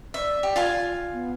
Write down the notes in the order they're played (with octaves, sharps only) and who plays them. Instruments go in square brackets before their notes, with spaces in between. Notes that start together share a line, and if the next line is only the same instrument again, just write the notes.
[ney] D5 [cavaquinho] E5
[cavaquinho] G4
F4 F5 G#5
[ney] B3